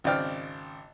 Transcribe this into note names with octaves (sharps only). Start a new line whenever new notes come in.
G#1 C#3 C4 D5 G5 F6